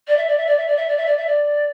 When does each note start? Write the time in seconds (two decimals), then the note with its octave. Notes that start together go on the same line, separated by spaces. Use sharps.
0.07 D5
0.17 E5
0.27 D5
0.37 E5
0.47 D5
0.57 E5
0.67 D5
0.77 E5
0.87 D5
0.97 E5
1.06 D5
1.17 E5
1.27 D5